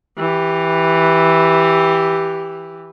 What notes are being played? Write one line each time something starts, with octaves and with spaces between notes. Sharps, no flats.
E3 G4